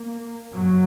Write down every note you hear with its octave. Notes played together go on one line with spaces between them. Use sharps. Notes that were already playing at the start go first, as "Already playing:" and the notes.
Already playing: A#3
F#2 C#3 F#3